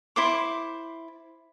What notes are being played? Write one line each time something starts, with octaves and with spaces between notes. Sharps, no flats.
E4 C5 D6